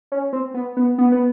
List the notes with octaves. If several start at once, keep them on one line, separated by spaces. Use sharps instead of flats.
C#4
C4
B3
B3
B3
B3